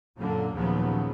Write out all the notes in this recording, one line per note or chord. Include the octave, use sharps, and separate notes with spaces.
F#2 A#2 D3 F#3 A#3
D#2 A#2 C#3 F3 F#3 B3